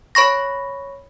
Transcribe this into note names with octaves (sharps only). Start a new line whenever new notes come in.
C#5 B5 C#6 A#6